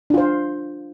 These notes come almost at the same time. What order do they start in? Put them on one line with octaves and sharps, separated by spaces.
D4 F4 C5